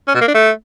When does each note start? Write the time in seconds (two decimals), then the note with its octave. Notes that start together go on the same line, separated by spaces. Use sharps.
0.08 C#4
0.15 B2
0.21 A#3
0.28 D4
0.34 A3